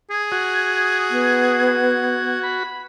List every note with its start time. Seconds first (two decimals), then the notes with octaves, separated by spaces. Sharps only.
0.10 G#4 G#6
0.32 F#4
1.11 B3
2.43 B5